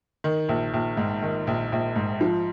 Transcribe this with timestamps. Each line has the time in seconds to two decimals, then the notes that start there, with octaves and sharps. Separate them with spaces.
0.24 D#3
0.49 A#1
0.74 A#1
0.97 G#2
1.22 D#3
1.47 A#1
1.72 A#1
1.96 G#2
2.21 F3